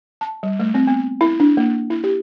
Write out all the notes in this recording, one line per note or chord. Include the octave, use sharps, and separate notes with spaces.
A5
G3
A3
C4
B3
E4
D4
A#3
E4
G4